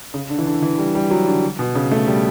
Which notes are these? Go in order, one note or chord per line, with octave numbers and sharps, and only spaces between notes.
C#3
D3
E3
D3
E3
G3
G3
F#3
D3
B2
C#3
A3
G3